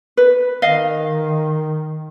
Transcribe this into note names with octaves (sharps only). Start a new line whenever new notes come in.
B4
D#3 D#5 F5